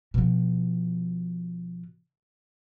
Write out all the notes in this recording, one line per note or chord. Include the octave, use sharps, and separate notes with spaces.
B2 F3